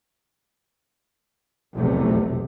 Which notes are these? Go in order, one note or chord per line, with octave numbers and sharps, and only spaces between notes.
F1 B1 E2 A2 C3 A3